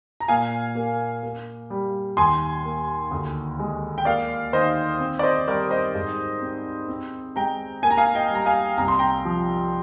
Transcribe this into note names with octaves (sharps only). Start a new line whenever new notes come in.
A#5
A#2 F5 G#5
A#3
A#3
G3
D#2 G#5 C6
A#3
D2
G#3
G5
A#3 D5 F5
D#3 C5 D#5
C4
D5
C5 D#5
G3 A#4 D5
C5 D#5
G#2
C4
C4
G#3 G5 A#5
A#3 G#5
A#5
F5 G#5
D#5 G5
G3 A#5
F5 G#5
C2 A#5
C6
G5 A#5
F3